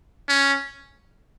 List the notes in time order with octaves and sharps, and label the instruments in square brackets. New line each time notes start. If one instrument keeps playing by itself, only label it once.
[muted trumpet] C#4